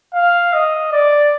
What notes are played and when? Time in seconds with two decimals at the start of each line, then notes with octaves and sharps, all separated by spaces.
0.14 F5
0.53 D#5
0.92 D5